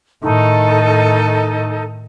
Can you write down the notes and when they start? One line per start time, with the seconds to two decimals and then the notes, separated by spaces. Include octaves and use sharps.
0.22 A2 D#3 D#4 A4